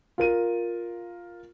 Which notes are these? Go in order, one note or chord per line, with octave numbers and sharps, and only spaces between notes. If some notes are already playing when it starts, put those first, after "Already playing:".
F4 A#4 D#7